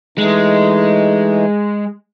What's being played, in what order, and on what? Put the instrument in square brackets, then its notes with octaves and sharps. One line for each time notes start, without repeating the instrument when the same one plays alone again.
[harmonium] E3 A3 D#4 [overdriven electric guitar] G#3